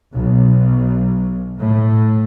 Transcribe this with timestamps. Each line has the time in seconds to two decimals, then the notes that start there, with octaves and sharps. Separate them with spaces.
0.14 B1
1.59 A2